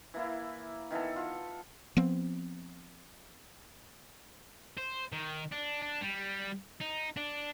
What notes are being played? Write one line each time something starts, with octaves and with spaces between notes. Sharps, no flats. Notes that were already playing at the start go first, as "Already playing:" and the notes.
E3 A#3 E4
D#3 E3 B3 A4
F4
F3 B3 C4
C5
D#3
D4
D4
G3
D#4
D4